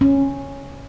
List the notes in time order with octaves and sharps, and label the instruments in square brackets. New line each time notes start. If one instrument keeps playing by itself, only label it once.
[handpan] C#4